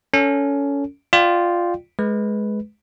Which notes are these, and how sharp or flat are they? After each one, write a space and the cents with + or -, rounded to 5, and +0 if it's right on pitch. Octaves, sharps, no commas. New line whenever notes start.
C#4 +20 A4 +25
F4 +0 D5 +25 G5 -15
G#3 +20 B4 +0